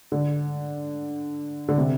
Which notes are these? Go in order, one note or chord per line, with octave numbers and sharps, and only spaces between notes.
D3
D3
C3